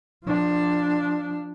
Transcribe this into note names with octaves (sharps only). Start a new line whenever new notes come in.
F3 D4